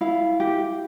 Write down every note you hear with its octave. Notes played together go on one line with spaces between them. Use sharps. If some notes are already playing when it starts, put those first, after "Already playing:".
E4 F5
G4